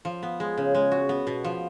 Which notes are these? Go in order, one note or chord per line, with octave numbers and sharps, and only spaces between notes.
F3
B3
G#3
C#3
G#3
F#4
B3
B2
F3